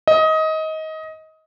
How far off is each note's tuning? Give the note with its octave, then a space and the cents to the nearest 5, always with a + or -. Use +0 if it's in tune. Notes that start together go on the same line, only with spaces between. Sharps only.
D#5 +20